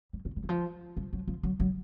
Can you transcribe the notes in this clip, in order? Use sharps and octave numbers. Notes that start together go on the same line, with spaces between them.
G3
A3
G3
E3
F3
G3
F#3
F3
F#3
F#3